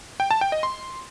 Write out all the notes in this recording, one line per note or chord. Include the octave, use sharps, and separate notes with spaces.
G5
A5
G5
D#5
C6